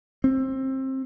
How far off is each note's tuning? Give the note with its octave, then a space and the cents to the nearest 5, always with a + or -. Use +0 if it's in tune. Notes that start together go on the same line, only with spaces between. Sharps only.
C4 +20